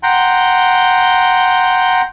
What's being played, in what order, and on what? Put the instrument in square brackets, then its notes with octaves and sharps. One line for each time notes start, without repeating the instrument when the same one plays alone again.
[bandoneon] F#5 G5 A#5 C6